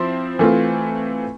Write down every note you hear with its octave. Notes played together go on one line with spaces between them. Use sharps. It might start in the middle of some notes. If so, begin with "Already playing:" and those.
Already playing: F3 C4 E4 C5
E3 A3 C4 F4